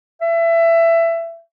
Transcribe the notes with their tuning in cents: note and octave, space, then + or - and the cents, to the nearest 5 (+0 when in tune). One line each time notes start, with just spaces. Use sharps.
E5 +20